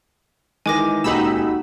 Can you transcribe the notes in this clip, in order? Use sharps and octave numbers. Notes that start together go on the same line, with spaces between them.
D#3 E3 G#3 G#5 D6 A#6
D#1 C#2 D#4 F#4 B5 E6